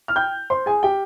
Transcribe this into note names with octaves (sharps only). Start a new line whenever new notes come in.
F6
G5 G6
C5 C6
G#4 G#5
G4 G5